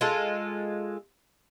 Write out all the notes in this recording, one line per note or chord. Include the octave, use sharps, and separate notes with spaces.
G#3 F4 A4